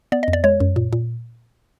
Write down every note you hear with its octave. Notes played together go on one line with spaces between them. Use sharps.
B3 D5
D#5
F2
D5
G#3 C#5
F#2
A#2
A#2